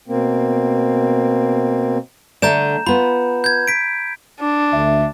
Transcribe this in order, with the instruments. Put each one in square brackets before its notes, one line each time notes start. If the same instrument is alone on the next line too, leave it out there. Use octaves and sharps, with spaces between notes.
[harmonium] B2 A#3 C4
[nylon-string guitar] D3 A3 D5 [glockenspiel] A#5 G6 E7
[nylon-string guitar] B3 F4 [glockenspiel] B5
[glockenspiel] G6 G#6
B6 D7
[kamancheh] D4
[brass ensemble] D2 E5